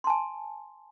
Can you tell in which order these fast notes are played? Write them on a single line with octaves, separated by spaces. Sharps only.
C6 A5 G#5